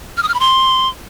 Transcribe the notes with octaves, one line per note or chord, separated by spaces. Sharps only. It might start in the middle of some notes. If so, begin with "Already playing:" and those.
F6
D#6
F6
B5
C6